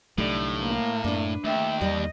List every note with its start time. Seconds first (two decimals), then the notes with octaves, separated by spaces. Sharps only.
0.18 C2 A2 D3 F#3 A3 D#4 G4
0.61 A#3
1.04 F#2 D4 B4
1.44 D#2 A3 E5 G5
1.81 E2 G3 G4 D#5